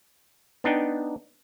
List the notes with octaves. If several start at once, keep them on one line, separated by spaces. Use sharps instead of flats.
B3 D4 D#4 G5